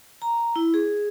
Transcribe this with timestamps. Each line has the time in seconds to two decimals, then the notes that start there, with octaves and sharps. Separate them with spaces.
0.22 A#5
0.56 E4
0.74 G#4